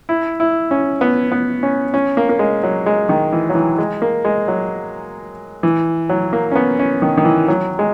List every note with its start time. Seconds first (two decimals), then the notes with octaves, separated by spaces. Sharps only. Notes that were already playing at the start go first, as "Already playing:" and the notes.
0.09 E4
0.40 E4
0.71 C#4
1.01 B3
1.32 B3
1.63 C#4
1.94 C#4
2.17 A#3
2.29 A#3
2.39 G#3
2.63 F#3
2.86 G#3
3.09 D#3
3.33 E3
3.49 F#3
3.55 E3
3.78 G#3
4.02 A#3
4.25 G#3
4.48 F#3
5.63 E3
6.09 F#3
6.33 A#3
6.52 C#4
6.56 B3
6.79 C#4
7.02 D#3
7.17 D#3
7.25 E3
7.48 F#3
7.79 G#3